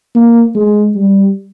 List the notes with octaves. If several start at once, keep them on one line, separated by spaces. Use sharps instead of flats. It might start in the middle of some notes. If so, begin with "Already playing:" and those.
A#3
G#3
G3